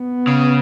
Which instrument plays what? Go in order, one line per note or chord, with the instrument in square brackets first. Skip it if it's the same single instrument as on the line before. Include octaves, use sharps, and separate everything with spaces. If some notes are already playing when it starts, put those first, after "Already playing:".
Already playing: [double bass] B3
[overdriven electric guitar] C#3